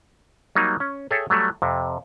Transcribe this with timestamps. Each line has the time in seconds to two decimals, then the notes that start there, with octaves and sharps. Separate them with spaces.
0.55 F#3 G3 A#3 D#4
0.80 C#4
1.11 G#4 A4 C#5 E5 G5
1.30 F#3 G3 A3
1.62 F2 C3